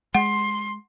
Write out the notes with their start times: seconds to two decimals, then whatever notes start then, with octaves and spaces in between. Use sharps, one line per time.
0.15 G#3 F#5 C6